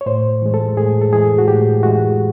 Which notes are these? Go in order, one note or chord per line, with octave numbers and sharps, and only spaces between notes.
C#5
A2 C5
E3 G#3
A4
A2 G#4
A4
E3 G#3 G#4
F#4
A2 G4
E3 G#3 F#4